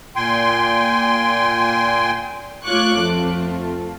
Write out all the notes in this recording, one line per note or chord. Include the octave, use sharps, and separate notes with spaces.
A#2 G5 G#5 C6
A3 F4 C#5 C#6 D6 F#6
F2 A3 C4 F4